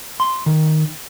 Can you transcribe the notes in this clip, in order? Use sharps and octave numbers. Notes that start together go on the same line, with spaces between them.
C6
D#3